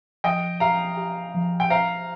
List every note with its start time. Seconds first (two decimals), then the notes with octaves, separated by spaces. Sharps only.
0.24 F3 D#5 G5
0.60 G4 F5 A#5
0.97 G4
1.34 F3
1.60 G5
1.70 C5 F5 A#5